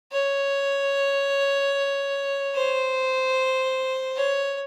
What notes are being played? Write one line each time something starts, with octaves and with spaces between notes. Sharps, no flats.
C#5
C5
C#5